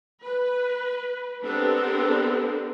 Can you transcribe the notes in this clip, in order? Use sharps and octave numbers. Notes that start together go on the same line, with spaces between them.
B4
B3 C4 D4 G4 A4 A#4